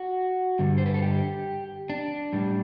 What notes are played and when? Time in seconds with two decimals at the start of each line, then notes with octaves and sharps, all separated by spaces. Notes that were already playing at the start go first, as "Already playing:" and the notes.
Already playing: F#4
0.59 G2 D3 G3
0.78 C5
0.86 B4
0.94 A4
1.02 G4
1.90 D4
2.33 A2 G3